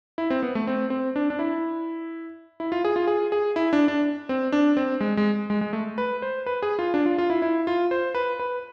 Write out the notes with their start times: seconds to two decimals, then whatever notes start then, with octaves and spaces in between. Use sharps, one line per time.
0.18 E4
0.30 C4
0.43 B3
0.55 A3
0.67 C4
0.90 C4
1.16 D4
1.30 D4
1.39 E4
2.60 E4
2.72 F4
2.85 G#4
2.96 F4
3.07 G#4
3.32 G#4
3.56 E4
3.73 D4
3.88 D4
4.29 C4
4.52 D4
4.77 C4
5.00 G#3
5.17 G#3
5.50 G#3
5.61 G#3
5.73 A3
5.98 B4
6.22 C5
6.46 B4
6.62 G#4
6.79 F4
6.94 D4
7.06 F4
7.18 F4
7.30 E4
7.42 E4
7.67 F4
7.91 C5
8.15 B4
8.40 B4